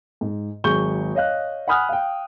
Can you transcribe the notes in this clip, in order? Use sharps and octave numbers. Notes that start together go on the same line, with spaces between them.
G#2
G#1 F#3 G#4 C#6 G6 G7
C#5 D#5 F5 F#6
F#5 G#5 B5 D#6 F6 F#6
F5 G5